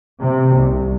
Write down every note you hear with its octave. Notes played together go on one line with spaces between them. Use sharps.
C3
C2